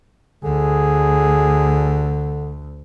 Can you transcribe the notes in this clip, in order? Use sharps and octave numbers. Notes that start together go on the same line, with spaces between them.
D2 D3 G#4